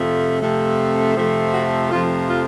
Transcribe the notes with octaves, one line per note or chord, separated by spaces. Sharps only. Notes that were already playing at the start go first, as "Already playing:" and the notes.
Already playing: F2 C3 F3 A3
F2 C3 F3 A3
F2 C3 F3 A3
F#4
F2 C3 F3 A3 F4
F4